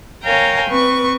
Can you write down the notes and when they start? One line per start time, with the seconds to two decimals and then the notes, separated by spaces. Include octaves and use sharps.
0.23 A#4 C#5 F5 G5 G#5 A#5
0.69 C4 B4 C#6